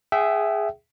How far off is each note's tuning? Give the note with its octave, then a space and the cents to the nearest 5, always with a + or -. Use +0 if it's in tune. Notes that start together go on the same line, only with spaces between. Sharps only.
G#4 +0 E5 +5 G5 -40